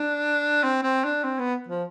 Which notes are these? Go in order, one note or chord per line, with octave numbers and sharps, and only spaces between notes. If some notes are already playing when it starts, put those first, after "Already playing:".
Already playing: D4
C4
C4
D4
C4
B3
F3